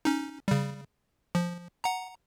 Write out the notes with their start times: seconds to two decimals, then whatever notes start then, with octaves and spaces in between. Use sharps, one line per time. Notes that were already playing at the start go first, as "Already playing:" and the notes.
0.05 C#4 D#4
0.48 C#3 G3
1.35 F3
1.84 F#5 A#5